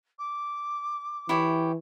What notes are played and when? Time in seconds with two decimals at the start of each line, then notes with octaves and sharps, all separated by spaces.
0.19 D6
1.29 E3 E4 G4 C#5